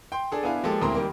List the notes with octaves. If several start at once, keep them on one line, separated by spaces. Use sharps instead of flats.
G5 C6
D4 G#4 A4
B3 D4 E4 F5 G#5
F3 G#3 A#3 G4 A4
D2 A#3 C4 E4 A#5 C6
D#3 G3 A#3